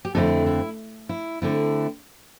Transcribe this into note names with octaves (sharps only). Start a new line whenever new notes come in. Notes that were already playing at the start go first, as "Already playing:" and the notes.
G4
F2 D3 A3 C4 E4 A4
E4
E4
D3 A3 C4 E4